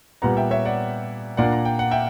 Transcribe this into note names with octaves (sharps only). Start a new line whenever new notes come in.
A#2 G3 B3 F#5 A#5
E5 G5
C#5 E5
D5 F#5
A#2 A#3 D4 D5 F#5
A#5
G5
F#5
E5 G5